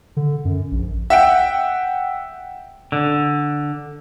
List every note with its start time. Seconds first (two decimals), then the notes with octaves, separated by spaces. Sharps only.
0.17 D3
0.45 F#2
0.72 A#1
1.10 E5 F#5 G5
2.92 D3